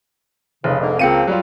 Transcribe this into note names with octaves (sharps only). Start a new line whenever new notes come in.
F1 G#2 C#3
G#2 D3 A#3
C#2 F3 A#3 C4 C#7 D#7
F#3 G3 F4